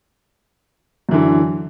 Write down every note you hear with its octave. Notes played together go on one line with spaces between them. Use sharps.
F#2 D3 E3